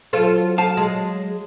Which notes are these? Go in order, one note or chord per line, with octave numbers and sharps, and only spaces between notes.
F#3 F4 A4 C5
F5 A5
G#3